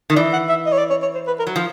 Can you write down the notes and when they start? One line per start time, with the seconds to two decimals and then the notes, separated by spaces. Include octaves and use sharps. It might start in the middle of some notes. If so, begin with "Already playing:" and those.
0.10 D#3
0.16 E3 D5
0.33 F#5
0.49 E5
0.66 D#5
0.72 C#5
0.78 D5
0.90 C#5
1.02 C#5
1.15 C5
1.27 B4
1.39 A#4
1.47 F#3
1.56 F3